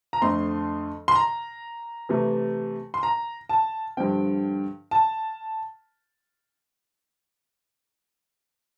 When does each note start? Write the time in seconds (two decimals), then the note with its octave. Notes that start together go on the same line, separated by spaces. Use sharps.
0.13 A#5
0.21 F2 D3 A3 C4 C6
1.08 C6
1.15 A#5
2.09 C3 E3 A3
2.94 C6
3.03 A#5
3.49 A5
3.97 G2 D3 F3 C4 G5
4.91 A5